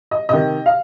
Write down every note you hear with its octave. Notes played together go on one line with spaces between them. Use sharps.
D#5
C3 D#3 D#5
F5